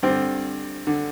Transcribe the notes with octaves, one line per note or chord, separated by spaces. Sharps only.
G2 D3 C4
D3